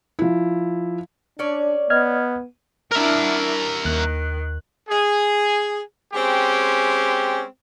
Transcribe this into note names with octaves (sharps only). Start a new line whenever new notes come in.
F3 E4
C#4 D4 C#5 D5
B3 D#5 F6 G#6
D4 E4 A#4 E5 F6
D#2 D#3 F#6
G#4
G#3 C4 C#4 G4